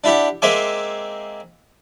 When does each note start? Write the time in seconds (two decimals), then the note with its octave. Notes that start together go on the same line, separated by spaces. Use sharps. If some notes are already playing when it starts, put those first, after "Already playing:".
0.04 D4 E4 G4 F#5
0.42 G#3 A#3 C4 E5 G#5 D6